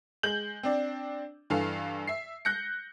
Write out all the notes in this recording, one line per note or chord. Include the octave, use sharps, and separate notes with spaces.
G#3 G6 F#7
C4 D4 D5
G2 E3 A4 F5
E5 C7
F#6 G6 A#6 C#7